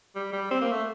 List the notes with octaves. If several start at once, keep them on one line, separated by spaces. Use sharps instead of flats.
G3
G3
C4
A#3
A3